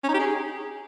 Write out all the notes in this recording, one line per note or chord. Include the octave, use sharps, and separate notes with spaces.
C#4
D#4
G4
G#4